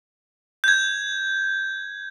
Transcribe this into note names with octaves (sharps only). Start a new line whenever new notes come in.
G6 G#6